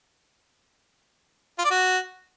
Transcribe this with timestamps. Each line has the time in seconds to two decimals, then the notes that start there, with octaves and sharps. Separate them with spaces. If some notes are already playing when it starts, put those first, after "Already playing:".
1.59 F4
1.65 D5
1.71 F#4